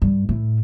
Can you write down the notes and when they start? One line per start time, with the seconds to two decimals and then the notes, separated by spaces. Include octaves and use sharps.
0.02 G2
0.29 A2